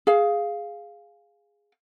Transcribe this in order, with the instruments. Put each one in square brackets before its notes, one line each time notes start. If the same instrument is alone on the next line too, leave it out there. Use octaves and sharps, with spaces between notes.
[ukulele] G#4 F5